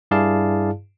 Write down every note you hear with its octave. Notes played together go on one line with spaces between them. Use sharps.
G2 E4 G#4 D5 F5 A5